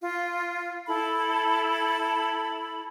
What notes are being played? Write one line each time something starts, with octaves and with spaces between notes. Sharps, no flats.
F4
E4 A4 B5